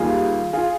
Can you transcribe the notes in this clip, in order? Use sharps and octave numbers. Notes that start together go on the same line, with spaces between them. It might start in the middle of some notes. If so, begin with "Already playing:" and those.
Already playing: D#2 D#3 G3 F4 G#4
F4 G#4